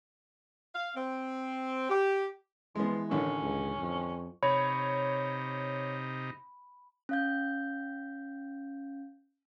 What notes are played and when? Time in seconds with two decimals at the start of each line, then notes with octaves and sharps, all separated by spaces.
0.75 F5
0.95 C4
1.89 G4
2.76 E3 F3 G#3 B3
3.11 A1 D3 D#3 C#4
3.41 C#2
3.79 F2
4.43 C3 D#4 C#5 B5
7.09 C#4 F5 G6